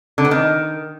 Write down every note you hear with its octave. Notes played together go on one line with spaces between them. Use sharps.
D3
B3
D#3